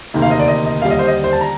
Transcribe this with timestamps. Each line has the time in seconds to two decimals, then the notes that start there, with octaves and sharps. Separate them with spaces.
0.14 D2 C3 D#3 A#3
0.22 F5
0.31 D#5
0.40 D5
0.48 D#5
0.65 D#5
0.82 D#2 D3 G3 F5
0.90 D#5
0.99 C5
1.07 D#5
1.24 C5
1.33 A5
1.41 A#5